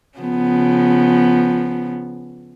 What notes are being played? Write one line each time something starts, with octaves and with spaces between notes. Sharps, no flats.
C#3 F3 B3